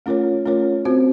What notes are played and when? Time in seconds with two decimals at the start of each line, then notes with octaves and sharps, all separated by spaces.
0.06 A3 C#4 F4 A#4 C#5
0.46 A3 C#4 F4 A#4 C#5
0.85 C4 F#4 C5